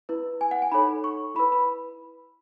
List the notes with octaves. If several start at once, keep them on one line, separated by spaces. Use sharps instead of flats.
E4 B4
G#5
F#5
G#5
D#4 A4 C#5 B5
C#6
E4 B4 B5
B5